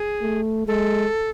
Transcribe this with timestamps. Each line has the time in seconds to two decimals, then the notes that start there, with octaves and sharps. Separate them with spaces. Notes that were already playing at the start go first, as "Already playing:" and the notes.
Already playing: G#4
0.22 A3
0.67 G#3 A4